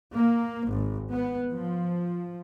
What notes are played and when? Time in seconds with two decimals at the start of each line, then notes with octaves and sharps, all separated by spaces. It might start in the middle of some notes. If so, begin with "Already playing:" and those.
0.15 A#3
0.71 G#1
1.10 B3
1.51 F3